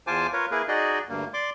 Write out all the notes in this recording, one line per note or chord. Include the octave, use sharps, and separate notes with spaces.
E2 F4 C5 G#5 A5 D6
F4 A#4 B4 C#5
A#3 E4 G#4 A#4 B4
D#4 F#4 G#4 D5 D#5
D2 G2 A#3
D5 C6 D6